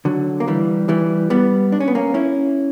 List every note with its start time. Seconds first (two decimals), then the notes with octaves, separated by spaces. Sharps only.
0.05 D3 F#3
0.40 A#3
0.48 E3 G3
0.89 E3 G3
1.30 G3 B3
1.72 D4
1.80 C#4
1.88 B3
1.95 A#3 C#4
2.14 C#4 E4